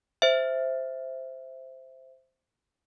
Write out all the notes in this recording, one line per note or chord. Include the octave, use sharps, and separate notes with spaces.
C5 E5